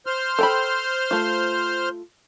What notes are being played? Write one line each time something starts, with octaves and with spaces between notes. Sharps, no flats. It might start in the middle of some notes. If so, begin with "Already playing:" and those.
C5 C6 F6
A4 G5 B5
A3 F4